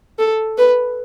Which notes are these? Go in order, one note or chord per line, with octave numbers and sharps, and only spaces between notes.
A4
B4